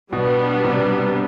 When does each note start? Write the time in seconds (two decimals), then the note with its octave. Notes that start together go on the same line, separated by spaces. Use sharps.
0.12 B2 G3 B3 D4
0.64 C3